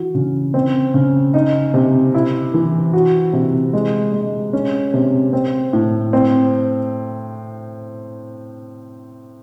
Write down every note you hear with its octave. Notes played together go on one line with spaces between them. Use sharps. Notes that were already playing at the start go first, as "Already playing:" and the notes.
Already playing: E3 F#4
C#3
C4
C#3
D#4
C3
E4
E3
F#4
C3
G#3
G#3
C#4
C3
C4
A2
C4